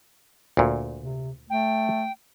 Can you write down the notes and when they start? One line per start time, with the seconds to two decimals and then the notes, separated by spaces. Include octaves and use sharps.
0.57 D2 A#2
1.02 C3
1.50 A3 G5